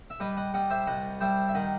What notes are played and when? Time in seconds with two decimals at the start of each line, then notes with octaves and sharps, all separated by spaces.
0.10 E5
0.20 G3 B4 D#5
0.37 D#5 F#5
0.54 G3 D#5 F#5
0.70 C5 E5
0.87 C2 D#5 F#5
1.20 G3 C5 E5
1.48 E5
1.55 D#3 D#5 F#5